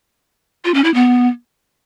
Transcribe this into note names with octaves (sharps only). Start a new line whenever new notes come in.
F4
C#4
E4
B3